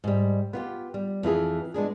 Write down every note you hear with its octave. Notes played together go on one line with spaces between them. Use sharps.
G#2 G3
B3 F4 G4
G3
F2 E3 E4 G#4
G#3 B3 D4 G#4